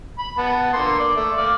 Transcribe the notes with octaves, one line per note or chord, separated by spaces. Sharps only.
B5
B3 A5
D3 A#3 C6
D5
A3 E5
D5 F5